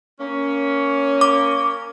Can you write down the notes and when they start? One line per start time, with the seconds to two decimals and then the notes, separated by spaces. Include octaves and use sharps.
0.20 A#3 C#4
1.21 D6